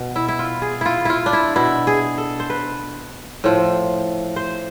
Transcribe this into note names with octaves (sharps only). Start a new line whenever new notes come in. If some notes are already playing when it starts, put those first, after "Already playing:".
Already playing: B2
E4
E4
F4
G#4
E4 F4
E4 F4
D4
E4
B2 E4
G#4
A4
C5
B4
A2 F3
C5